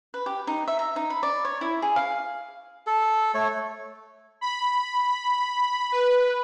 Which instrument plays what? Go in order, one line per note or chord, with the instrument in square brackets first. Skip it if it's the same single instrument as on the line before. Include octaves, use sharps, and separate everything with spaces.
[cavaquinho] B4
G4
D#4
E5
A#5
D#4
B5
D5
C#5
E4
G#4
F5
[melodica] A4
A3 C#5
[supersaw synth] B5
B4